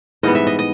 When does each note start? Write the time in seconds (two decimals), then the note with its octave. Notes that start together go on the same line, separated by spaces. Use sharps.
0.23 G#2 E3 G3 B3 D#5
0.35 E5
0.47 D#5
0.59 D#5